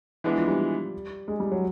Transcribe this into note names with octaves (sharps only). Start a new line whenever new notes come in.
E3 G#3 B3 D4
F3
G3
G#3
G3
F#3